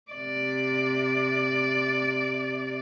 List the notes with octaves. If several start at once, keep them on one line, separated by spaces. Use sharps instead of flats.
C3 D5